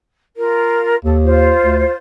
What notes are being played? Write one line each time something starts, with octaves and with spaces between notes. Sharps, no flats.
F4 A#4
D#2 A4
F4 C5
D2